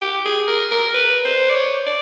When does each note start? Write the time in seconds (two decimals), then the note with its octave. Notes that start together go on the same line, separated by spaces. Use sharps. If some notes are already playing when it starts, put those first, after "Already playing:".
0.02 G4
0.25 G#4
0.48 A#4
0.71 A#4
0.94 B4
1.25 C5
1.49 D5
1.55 C#5
1.86 D5